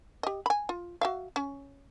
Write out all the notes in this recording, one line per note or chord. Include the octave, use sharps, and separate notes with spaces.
G4 D#5
G#5 B5
F4
F#4 E5 F5
C#4